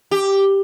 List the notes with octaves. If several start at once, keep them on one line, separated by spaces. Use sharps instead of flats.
G4